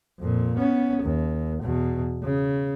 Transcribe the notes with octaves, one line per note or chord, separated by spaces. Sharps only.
F2 A#2
B3 C#4
D#2
E2 B2
C#3